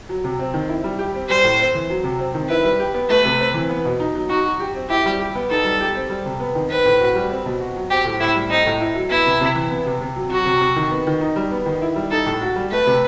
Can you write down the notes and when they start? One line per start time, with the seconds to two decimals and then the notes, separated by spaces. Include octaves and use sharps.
0.09 F#3
0.24 C3
0.39 C4
0.54 D#3
0.69 E4
0.84 G3
0.99 G4
1.14 C4
1.29 G3 C5
1.44 A2
1.59 C4
1.74 E3
1.90 F#3
2.04 C3
2.19 C4
2.34 D#3
2.49 E4 B4
2.64 G3
2.80 G4
2.94 B3
3.09 A3 B4
3.25 C3
3.39 C4
3.54 E3
3.69 B3
3.85 B2
4.00 D#4
4.15 F#3
4.29 D#4 F#4
4.44 F#3
4.60 G4
4.75 C4
4.90 E4 G4
5.05 G3
5.19 G4
5.35 B3
5.50 D#4 A4
5.64 G3
5.80 G4
5.95 C4
6.09 G3
6.26 C3
6.40 B3
6.55 D#3
6.70 C4 B4
6.86 A2
7.00 F#4
7.15 G3
7.30 C4
7.46 B2
7.61 F#4
7.76 F#3
7.90 C4 G4
8.05 A2
8.20 A2 E4
8.35 G3
8.50 C4 D#4
8.66 A2
8.80 E4
8.95 F#3
9.10 B3 E4
9.26 C3
9.41 C3
9.55 E3
9.70 B3
9.86 C3
10.01 C3
10.16 F#3
10.31 F#3 F#4
10.45 C3
10.61 C3
10.76 D#3
10.91 B3
11.07 D#3
11.21 D#4
11.36 G3
11.51 B3
11.66 D#3
11.81 E4
11.96 G3
12.11 D#4 A4
12.26 A2
12.41 F#4
12.56 G3
12.72 A3 B4
12.87 C3